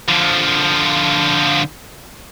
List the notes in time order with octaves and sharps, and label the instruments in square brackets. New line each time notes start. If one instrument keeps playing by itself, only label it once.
[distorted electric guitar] D3 F3